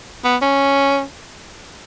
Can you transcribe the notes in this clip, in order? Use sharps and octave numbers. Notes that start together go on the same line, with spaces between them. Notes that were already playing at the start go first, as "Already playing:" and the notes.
B3
C#4